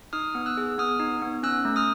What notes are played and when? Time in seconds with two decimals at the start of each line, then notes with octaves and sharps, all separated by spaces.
0.13 D#4 D#6 F6
0.35 B3
0.46 E6 F#6
0.57 G#4
0.78 B3 D#6 F6
1.00 D#4
1.22 B3
1.43 C#4 E6 F#6
1.65 A3
1.76 D#6 F6